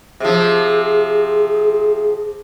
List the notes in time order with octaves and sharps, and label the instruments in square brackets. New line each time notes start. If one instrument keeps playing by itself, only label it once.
[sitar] C3 F3 [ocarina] G#4